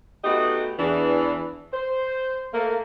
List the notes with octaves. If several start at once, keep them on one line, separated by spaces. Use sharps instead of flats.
A3 B3 D#4 F#4 G4 D#5
E2 E3 D4
C5
A3 A#3